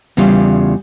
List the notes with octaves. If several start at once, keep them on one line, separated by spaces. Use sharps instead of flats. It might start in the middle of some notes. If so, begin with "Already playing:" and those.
E2 C#3 G3 F4